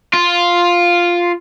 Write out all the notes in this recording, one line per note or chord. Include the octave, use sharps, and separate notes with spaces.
F4